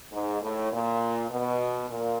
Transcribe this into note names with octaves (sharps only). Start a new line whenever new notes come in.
G#2
A2
A#2
B2
A#2